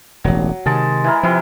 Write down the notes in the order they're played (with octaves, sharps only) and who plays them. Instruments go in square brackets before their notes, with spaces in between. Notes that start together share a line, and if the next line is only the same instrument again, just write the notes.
[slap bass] E1 A1 [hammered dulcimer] F#3
[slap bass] C3 D#3 [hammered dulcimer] G#3 A5
[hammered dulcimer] E3 E4 A#4
[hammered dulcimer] C3 E3 E4 [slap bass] F3